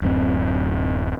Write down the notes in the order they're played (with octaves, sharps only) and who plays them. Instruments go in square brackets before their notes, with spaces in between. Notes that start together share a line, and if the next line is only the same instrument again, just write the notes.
[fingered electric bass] D1 F#2 G3 C4